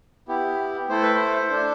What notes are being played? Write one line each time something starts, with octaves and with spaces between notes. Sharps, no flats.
B3 E4 G4
A3 E4 A4 C5
B4
C5
D4 A4